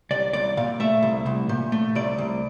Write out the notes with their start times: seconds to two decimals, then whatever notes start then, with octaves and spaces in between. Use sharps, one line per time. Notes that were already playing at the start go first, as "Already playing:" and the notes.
0.11 C2 D5
0.33 C2 D5
0.57 A#2 F5
0.80 A3 E5
1.02 C2
1.26 C2
1.49 A#2
1.72 A3
1.95 C2 D5
2.18 C2